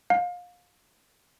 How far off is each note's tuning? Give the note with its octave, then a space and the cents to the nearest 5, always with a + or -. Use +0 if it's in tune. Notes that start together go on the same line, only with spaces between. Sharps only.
F5 +30